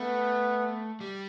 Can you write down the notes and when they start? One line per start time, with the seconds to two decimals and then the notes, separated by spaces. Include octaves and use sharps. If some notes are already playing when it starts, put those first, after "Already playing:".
Already playing: A3 B3
1.01 G3